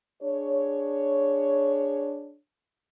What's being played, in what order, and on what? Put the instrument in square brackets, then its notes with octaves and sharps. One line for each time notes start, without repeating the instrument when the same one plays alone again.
[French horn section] D4 G#4 C#5